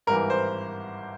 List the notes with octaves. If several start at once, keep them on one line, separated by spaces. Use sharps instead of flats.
G#1 G2 E3 A#4
C5